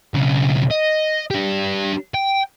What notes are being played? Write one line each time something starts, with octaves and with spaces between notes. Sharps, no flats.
B1 C#3
D#5
D4 G4
G5